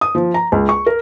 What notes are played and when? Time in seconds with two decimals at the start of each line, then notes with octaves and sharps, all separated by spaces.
0.01 D#6
0.15 F3
0.34 A#5
0.52 C#2
0.69 C#6
0.86 A#4